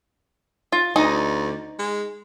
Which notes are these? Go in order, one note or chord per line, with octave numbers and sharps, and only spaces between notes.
F4
D2 D#4 D#5
G#3